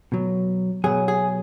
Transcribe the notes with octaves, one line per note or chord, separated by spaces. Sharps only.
B2 F#3
B2 F#3 G#4
G#4